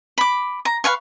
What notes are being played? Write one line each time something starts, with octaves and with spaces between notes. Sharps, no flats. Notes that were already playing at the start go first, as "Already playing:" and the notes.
B5 D6
A#5
B4 F5 G#5 C#6